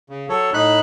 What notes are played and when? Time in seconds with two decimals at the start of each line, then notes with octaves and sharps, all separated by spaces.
0.10 C#3
0.29 F#3 A4 C#5
0.54 A2 D#4 B5 F#6